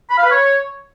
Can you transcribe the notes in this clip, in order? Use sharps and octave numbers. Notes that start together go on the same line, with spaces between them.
B5
F5
B4
C#5